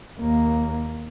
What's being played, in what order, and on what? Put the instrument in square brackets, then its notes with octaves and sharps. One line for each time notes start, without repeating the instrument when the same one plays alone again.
[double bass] D#2 A#3